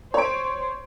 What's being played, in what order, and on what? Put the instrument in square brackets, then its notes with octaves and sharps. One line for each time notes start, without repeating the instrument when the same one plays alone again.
[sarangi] C5 [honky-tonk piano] C#5 D7